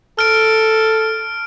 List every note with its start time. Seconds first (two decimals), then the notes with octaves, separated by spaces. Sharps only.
0.19 A4 F6 D7